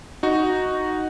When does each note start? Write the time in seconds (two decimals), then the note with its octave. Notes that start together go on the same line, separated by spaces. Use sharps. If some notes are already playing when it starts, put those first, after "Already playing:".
0.23 D#4 F#4